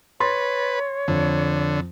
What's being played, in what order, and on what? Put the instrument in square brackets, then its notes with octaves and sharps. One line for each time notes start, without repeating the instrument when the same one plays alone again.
[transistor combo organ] B4 [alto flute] C#5 [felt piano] C6 A6
[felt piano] F2 [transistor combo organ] D3